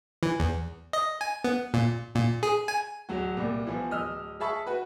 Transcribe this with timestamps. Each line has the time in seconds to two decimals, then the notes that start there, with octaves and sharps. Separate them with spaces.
0.23 E3
0.40 E2
0.93 D#5
1.21 G#5
1.44 B3
1.74 A#2
2.15 A#2
2.43 G#4
2.68 G#5
3.09 D1 F#3 F#4
3.37 C2 A#2
3.67 E3 F3 B3
3.91 D1 D#5 E6 F6
4.40 G#4 E5 A5 B5 C#6
4.66 F#4 B4